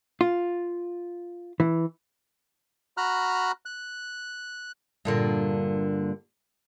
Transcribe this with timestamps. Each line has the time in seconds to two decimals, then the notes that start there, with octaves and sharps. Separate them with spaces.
0.21 F4
1.60 E3
2.97 F#4 A#5 B5 F6 F#6
3.66 F#6
5.05 G2 A#2 D3